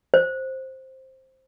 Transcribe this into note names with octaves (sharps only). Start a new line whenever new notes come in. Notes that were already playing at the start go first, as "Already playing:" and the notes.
C5